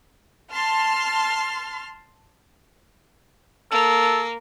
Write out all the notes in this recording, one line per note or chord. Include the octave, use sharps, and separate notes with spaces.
A5 C6 F6
A#3 A4